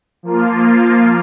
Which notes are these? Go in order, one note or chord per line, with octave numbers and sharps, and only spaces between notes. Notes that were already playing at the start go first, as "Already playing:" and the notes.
F3 A#3 F4